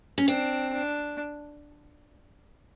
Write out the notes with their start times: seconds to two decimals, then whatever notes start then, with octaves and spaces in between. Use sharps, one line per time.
0.18 C#4
0.28 C4 D4
0.72 D4